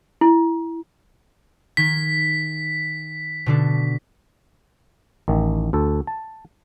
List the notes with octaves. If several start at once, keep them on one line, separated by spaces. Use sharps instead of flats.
E4
D#3 G#6 B6
B2 D3 D4
A1 D#3
D2 A4
A5